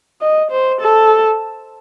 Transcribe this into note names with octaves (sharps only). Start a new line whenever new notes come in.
D#5
C5
A4